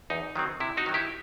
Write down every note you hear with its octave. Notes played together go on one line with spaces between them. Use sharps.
E2 D#4
D#3 F#3 C4
C3 E4
D#4 F#4
D#3 F#3
E4 G4